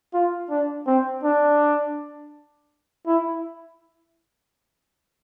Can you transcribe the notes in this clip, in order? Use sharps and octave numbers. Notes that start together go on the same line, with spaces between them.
F4
D4
C4
D4
E4